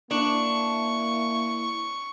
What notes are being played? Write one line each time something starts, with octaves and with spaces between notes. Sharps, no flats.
A#3 D4 E4 C#6